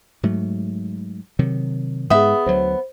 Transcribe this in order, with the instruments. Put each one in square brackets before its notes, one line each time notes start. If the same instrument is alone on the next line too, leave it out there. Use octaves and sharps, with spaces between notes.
[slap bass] G#2 F#3 A3
C3 D#3 F#3
[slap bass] G#2 [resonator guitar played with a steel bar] B3 E5 [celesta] G#4 D#6
[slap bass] D2 F#3 [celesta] C5